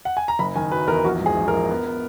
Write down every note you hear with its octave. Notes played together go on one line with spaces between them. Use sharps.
F#5
G#5
A#5
F#1 B5
D#3 G#5
F#3 B4
E2 A#4
A#1 F#4
G#2
G#4
A#1
A#4
A#1
B3
B3